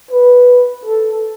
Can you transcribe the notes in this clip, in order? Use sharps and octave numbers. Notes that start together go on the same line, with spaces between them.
B4
A4